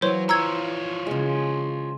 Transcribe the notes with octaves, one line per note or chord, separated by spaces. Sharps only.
E3 F#3 C5 C#5 F5 C6
F4 C5 C#5 A#5 E6 G#6
C#3 G#3